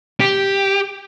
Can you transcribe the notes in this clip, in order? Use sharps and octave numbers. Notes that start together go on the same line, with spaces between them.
G4